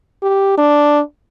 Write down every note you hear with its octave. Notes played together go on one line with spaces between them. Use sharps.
G4
D4